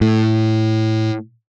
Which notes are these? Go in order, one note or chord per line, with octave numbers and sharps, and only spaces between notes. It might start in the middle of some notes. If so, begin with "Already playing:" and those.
A2